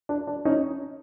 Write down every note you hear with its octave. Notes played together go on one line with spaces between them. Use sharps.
D4
D4
C#4 D#4